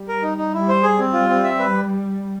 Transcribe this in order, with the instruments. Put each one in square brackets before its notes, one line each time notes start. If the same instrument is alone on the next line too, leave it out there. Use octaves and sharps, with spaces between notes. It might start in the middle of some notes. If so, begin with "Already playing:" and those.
Already playing: [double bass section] G3
[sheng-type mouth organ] A#4
D#4
D#4
[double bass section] G3 [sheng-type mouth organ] E4
[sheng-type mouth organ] C5
G#4
C4
F4
C4
E5
B4